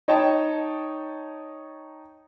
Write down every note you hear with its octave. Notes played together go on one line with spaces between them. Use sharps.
D#4 C#5 D#5 G5 A5